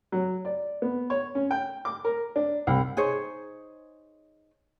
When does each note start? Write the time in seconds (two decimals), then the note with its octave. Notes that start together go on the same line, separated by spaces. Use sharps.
0.12 F#3
0.45 D5
0.82 B3
1.10 C#5
1.35 C#4
1.51 G5
1.85 D6
2.05 A#4
2.36 D4
2.67 C2
2.97 D#4 G#4 C5 C#5